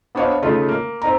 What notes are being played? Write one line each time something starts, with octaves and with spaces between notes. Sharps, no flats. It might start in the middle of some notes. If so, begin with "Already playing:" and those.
B3 D4 C5 C#5 D#5 F5
C#3 A3 D#4 F4
A#3
C4 D#4 A#5